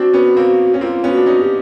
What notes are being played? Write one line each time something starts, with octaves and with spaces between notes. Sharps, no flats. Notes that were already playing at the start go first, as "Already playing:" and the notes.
Already playing: C4 D4 F#4
B3 C#4
A#3 C4
C#4
A#3 C4 F4
B3 C#4
F#4
D4
C#4 D#4
G4